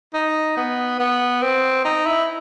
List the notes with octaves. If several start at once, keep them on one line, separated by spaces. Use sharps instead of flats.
D#4
B3
B3
C4
D#4
E4